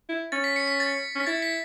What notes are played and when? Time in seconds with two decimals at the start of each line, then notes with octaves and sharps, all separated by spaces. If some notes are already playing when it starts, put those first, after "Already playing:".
0.09 E4
0.32 C#4 A6
0.44 B6
0.56 C#7
0.68 B6
0.80 A6
1.15 C#4 B6
1.27 E4 A6
1.42 B6